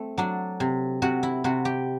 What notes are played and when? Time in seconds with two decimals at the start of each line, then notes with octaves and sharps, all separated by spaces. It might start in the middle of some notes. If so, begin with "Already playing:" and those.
Already playing: A3 C4
0.18 F#3 D4
0.60 C3
1.02 C3 F#4
1.23 E4
1.44 C3 F#4
1.65 G4